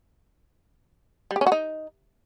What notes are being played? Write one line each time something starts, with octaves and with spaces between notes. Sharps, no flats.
G3
G4
C#4
F#4
D#4